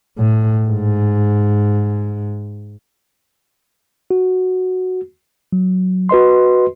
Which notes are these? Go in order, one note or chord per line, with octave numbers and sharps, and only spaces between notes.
A2
G#2
F#4
F#3
F#4 B4 D#5 C6